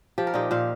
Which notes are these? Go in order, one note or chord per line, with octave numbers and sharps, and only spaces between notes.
F3 G4
A#4
A#2 D#4 G4
A#2 C5 F5